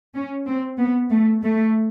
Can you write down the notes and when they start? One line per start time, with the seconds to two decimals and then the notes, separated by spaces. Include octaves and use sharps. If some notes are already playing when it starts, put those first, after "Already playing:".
0.15 C#4
0.47 C4
0.79 B3
1.10 A3
1.42 A3